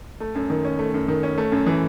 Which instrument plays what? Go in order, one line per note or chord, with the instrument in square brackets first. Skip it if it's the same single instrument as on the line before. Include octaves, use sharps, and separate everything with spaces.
[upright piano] A3
F#2
D#3
C#4
A3
F#2
D#3
C#4
A3
F#2
E3